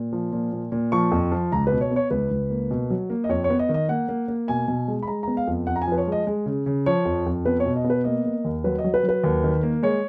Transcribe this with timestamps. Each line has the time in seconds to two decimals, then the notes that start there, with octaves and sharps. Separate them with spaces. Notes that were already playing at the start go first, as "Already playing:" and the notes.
Already playing: A#2
0.13 F3
0.33 A#2
0.52 A#2
0.72 A#2
0.92 F3 C#6
1.12 F2
1.32 F3
1.52 C#2 A#5
1.67 B2 B4
1.81 C#5
1.91 B3 C#5
2.11 C#2 B4
2.31 C#2
2.50 A#3
2.71 B2
2.90 F#3
3.10 A#3
3.24 D#5
3.29 F2 C#5
3.44 C#5
3.50 B3
3.59 D#5
3.69 D#3
3.74 D#5
3.89 A#3 F#5
4.09 A#3
4.28 A#3
4.48 B2 G#5
4.68 B2
4.88 G#3
5.03 B5
5.07 G#3 A#5
5.23 B3 A#5
5.37 F5
5.47 F2
5.67 F2 F#5
5.76 A#5
5.82 G#5
5.87 F3 B4
5.98 C#5
6.07 G#3
6.12 D#5
6.27 G#3
6.46 C#3
6.66 C#3
6.86 F3 C#5
7.05 F2
7.26 F2
7.45 B3 B4
7.60 C#5
7.66 B2
7.76 D#5
7.84 B3
7.90 B4
8.04 A#3 D#5
8.25 A#3
8.45 D#2
8.64 F#3 B4
8.78 D#5
8.84 F#3
8.94 B4
9.03 F#3
9.09 B4
9.24 D#2
9.44 D#3
9.63 A#3
9.83 G#3 C#5